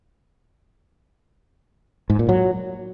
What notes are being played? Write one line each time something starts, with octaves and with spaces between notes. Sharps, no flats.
G#2
A#2
F#3